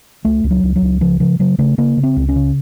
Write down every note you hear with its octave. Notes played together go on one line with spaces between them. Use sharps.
C#2 A3
C#2
F#3
C#2
F#3
C#2
C#3 F3
C#3 F3
C#3 F#3
C#3 A3
C#3 A#3
C#3
C4
C#2
C#4
C#3